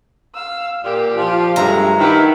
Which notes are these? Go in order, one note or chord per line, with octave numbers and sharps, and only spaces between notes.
F5 E6
A#2 G4
F3 F4
G2 F#3 G#3 A3 A#5
D#3 E4 F#4 G4 B4